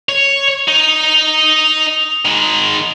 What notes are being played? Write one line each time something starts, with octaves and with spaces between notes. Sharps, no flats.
C#5
D#4
D#3 G#3